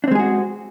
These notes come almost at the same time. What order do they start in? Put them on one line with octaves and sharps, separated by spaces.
D4 C4 G#3 G#4 F#4